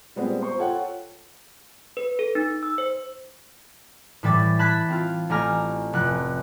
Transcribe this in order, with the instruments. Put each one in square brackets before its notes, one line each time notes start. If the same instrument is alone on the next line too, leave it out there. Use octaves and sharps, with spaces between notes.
[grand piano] A#2 G3 G#3 B3 C4
C5 C6 C#6
F4 A4 C#5 F#5 G5
[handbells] B4
A4
D#4
E6
C5
[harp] A2 E3 G3 E5 D6 A6
A5 B5 F#6 G#6 A6 B6
C4 F4
A1 A3 G4 G#5 A#5 F6
F1 F#6